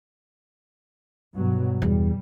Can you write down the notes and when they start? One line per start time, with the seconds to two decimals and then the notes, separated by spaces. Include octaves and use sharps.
1.34 G2 B2 F#3
1.82 E2 G3